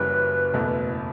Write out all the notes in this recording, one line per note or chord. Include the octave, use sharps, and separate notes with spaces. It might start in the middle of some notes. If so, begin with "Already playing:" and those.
Already playing: F#1 F#2 E3 G3 B4
F#1 E2 B2 A3 E4